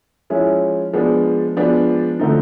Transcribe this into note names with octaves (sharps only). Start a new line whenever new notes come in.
F3 G#3 C#4 E4
F3 G#3 B3 D4
F3 G#3 B3 D4
D3 F3 A3 C4 D#4